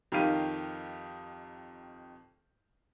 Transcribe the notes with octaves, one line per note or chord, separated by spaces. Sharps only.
F2 D#3 D#4 G4 F5 D#7